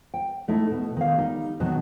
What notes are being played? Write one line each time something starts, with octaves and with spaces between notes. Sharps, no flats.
G5
A3 D#4 E4
B2
D#3 F5
G3 D#4
B2 D#3 F#3 B3